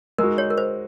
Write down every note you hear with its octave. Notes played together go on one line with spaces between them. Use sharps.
G#3 D#4 F#4 A#4
C#5
A#4
C5